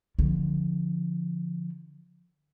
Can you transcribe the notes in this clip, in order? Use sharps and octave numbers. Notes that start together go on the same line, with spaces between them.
D3 F3